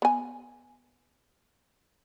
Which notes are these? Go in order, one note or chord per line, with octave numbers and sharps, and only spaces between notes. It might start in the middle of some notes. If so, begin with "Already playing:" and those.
B3 G#5